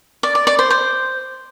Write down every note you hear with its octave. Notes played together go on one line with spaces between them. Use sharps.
D5
D5
D5
C5
C5